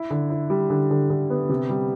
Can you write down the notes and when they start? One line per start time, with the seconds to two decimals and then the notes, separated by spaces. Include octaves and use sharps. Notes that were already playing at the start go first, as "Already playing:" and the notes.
Already playing: E4
0.10 D3
0.30 E4
0.50 G3
0.70 D3
0.90 D3
1.10 D3
1.30 B3
1.49 C3
1.70 G3